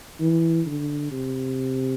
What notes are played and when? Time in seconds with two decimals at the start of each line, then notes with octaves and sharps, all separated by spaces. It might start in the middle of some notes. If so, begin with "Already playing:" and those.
0.20 E3
0.66 D3
1.12 C3